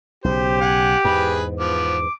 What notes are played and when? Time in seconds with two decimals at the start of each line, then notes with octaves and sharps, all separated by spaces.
0.24 B1 C#3 G4 C5
0.61 F#5 G#5
1.05 E2 G#2 G#4 B4 B5
1.60 F3 B3 D6